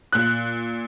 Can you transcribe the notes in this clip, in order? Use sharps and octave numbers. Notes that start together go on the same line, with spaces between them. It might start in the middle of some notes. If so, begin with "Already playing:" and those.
A#2 F#6